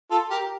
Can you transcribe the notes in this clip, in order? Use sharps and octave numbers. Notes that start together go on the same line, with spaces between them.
F4 A4
G4 A#4